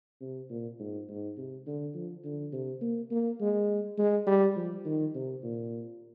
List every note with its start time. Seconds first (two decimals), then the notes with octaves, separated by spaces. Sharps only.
0.21 C3
0.50 A#2
0.79 G#2
1.08 G#2
1.37 C3
1.66 D3
1.95 F3
2.24 D3
2.53 C3
2.81 A#3
3.11 A#3
3.40 G#3
3.98 G#3
4.27 G3
4.56 F3
4.85 D#3
5.14 C3
5.43 A#2